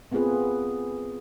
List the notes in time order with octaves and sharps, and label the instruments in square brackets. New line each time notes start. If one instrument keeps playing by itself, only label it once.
[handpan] A3 B3 C4 F4 G#4 B4